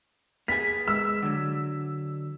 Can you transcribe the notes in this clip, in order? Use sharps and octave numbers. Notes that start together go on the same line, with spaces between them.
A#3 B3 G#4 B6
G#3 E6
D3 F#3